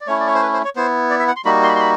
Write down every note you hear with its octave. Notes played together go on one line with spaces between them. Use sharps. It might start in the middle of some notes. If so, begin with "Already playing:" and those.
D5
A3 C#4 E4 C#5
D5
C#5
C5
B4
C5
C#5
B3 E4 C5
D5
E5
F#5
C6
G3 A#3 D#4 F#4 B5
C6
B5
C6
B5